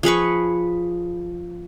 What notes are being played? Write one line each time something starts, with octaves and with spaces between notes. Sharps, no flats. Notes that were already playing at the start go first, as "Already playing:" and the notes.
F3 G#4 B4 C#6